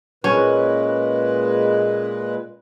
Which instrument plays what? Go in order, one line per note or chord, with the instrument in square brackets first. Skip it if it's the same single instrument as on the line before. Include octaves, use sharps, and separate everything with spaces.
[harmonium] A#2 G#3 B4 [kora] C#4